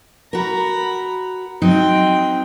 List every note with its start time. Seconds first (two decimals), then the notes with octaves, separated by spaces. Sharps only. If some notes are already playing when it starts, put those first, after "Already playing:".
0.33 F#4 A#4 A#5 B5
1.62 F#3 C4 D#4 G5